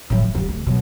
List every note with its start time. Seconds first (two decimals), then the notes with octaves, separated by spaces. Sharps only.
0.10 A2 F#3
0.23 F#3
0.35 F3 G3
0.49 D2
0.67 B2 F#3